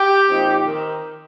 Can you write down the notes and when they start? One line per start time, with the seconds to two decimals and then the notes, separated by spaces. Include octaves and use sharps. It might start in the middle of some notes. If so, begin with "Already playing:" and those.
Already playing: G4
0.29 A#2 F3 C4 D#4
0.66 D#3 C4 D#4